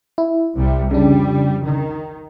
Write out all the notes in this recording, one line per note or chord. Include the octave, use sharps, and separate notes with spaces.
E4
C2 C3 G3
F2 C#3 G3 D4
D#3